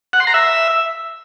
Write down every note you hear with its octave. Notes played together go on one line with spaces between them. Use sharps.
F#5
C6
A#5
E5